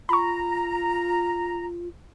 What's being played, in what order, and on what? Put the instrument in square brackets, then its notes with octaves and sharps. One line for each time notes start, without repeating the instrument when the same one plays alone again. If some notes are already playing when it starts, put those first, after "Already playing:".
[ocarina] F4 [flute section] A#5 [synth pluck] B5 C#6